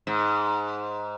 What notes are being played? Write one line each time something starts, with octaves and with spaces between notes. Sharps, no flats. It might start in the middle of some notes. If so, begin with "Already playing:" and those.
G#2